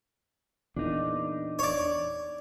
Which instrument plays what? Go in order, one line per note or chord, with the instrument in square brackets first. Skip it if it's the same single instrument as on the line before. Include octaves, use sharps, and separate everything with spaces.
[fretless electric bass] E2 A#2 [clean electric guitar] D4 D#4
[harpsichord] C#5 D5